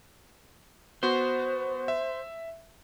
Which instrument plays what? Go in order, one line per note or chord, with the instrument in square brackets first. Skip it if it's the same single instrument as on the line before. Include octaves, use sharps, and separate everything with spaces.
[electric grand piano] B3 F#4 [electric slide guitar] C5
[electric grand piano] E5